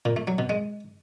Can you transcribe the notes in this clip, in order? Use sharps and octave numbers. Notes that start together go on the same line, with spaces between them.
A#2
A3
F#3
B2
G#3